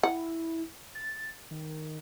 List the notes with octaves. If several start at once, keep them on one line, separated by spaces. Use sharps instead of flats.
E4 F#5
A6
D#3